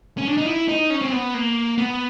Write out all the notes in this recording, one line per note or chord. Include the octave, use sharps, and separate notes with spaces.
C#4
D4
D#4
E4
D#4
C#4
C4
B3
A#3
B3